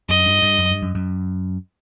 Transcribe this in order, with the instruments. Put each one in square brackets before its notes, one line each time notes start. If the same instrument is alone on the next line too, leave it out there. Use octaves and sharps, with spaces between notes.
[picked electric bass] F#2 [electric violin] D#5
[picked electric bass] G2
G2
F#2
G2
F#2
F#2